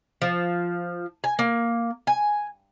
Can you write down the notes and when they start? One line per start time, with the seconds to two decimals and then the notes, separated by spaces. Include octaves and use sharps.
0.22 F3
1.24 G#5
1.39 A#3
2.07 G#5